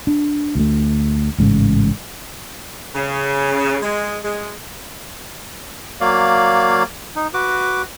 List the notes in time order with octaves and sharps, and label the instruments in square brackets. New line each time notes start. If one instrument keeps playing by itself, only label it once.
[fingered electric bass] D4
D2 A3
A1 G#2 C#3
[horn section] C#3
G#3
G#3
[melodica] F#3 A#3 D5 F5
D#4
F#4 B4 D6